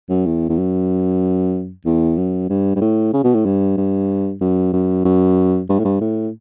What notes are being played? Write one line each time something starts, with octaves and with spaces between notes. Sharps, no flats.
F#2
E2
E2
F#2
E2
F#2
G2
G2
A2
C#3
B2
A2
G2
G2
F#2
F#2
F#2
G2
A2
G2
A2